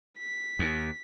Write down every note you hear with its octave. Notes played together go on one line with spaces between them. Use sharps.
B6
D#2